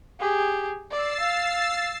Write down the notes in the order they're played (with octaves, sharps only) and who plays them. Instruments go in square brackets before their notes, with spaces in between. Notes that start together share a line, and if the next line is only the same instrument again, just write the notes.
[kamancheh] G4 G#4
[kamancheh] D5 [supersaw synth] E6 A6 C7
[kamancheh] F5